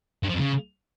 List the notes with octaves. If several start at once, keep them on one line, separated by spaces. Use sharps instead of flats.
G2
F3
F2
C#3